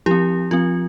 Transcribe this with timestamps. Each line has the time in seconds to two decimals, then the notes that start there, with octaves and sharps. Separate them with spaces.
0.06 F3 C4 E4 G4
0.51 F3 C4 F4